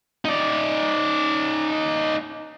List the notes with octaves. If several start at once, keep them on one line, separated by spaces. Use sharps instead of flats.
D#4 D5